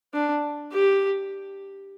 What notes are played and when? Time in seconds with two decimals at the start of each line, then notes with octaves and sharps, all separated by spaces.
0.14 D4
0.72 G4